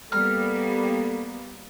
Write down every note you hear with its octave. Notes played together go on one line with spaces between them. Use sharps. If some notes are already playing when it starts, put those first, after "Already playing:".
G3 A#3 B3 A4 A#5 F6